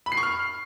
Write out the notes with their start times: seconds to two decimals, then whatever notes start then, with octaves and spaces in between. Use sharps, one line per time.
0.06 B5
0.12 C7
0.17 C#6
0.23 F6